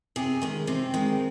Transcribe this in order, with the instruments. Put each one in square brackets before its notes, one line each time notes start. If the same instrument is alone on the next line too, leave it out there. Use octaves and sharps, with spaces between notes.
[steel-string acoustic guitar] C3 G#4
D#3 G#3 C#4
C3 C4
D#3 G#3